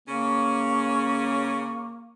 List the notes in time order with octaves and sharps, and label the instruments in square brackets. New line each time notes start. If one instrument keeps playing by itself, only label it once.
[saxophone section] C#3 C#4 [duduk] A#3 [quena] C#6